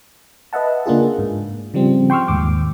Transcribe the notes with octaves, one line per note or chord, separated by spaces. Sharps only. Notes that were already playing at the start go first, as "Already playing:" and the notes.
B4 D#5 E5 F#5 A5
C#3 A#3 D4 F4 G#4
G#2
C#3 F3 G3 C4
G5 C6 C#6 E6 F6
D#2 G#2 D6